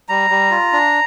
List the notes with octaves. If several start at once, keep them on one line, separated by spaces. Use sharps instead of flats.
G3 A#5
G3
F4
D4